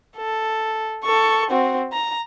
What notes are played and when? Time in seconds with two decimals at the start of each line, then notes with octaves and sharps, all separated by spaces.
0.17 A4
1.04 A4 C#6
1.50 C4 F#4
1.92 A#5